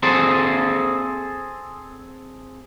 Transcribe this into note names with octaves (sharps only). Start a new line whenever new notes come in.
C4 G#4 A4 C5